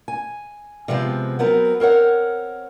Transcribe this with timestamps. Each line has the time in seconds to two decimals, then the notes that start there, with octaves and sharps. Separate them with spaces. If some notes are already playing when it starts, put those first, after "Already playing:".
0.08 G#5
0.88 C3 F3 G#3 B3 C4
1.39 F#3 B3 C4 A#4
1.80 C4 A#4 C#5 F#5